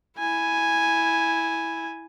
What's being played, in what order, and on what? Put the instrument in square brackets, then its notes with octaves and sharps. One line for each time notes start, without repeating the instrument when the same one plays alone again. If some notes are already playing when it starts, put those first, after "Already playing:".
[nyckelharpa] E4 G#5